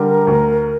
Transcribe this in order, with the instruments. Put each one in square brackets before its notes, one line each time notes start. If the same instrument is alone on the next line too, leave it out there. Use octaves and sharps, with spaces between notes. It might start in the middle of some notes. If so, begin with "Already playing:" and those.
Already playing: [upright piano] D3 G3 [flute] A#4
[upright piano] D2